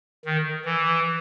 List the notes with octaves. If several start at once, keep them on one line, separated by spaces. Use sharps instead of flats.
D#3
E3